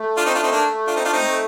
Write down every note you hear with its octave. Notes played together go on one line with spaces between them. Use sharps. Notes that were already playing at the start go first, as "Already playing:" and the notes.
Already playing: A3
D4 F4
C4 D#4
D4 F4
C4 D#4
A#3 D4
D4 F4
C4 D#4
D4 F4
C4 D#4
A3